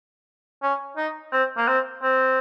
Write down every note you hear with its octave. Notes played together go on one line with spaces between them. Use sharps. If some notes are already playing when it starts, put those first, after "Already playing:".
C#4
D#4
C4
A#3
C4
C4